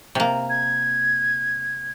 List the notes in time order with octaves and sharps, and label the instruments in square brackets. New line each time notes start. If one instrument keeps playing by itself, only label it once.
[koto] C3 A#3
[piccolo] G#6